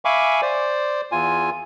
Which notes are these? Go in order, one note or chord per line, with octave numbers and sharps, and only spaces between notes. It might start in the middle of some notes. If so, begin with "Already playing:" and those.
E5 F5 G#5 B5 C#6 D6
C5 D5
E2 F4 G#5